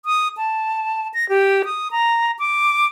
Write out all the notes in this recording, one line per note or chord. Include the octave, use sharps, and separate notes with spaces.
D#6
A5
A#6
G4
D#6
A#5
D6